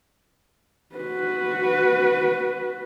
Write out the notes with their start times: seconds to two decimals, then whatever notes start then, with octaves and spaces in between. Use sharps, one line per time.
0.96 F#4 B4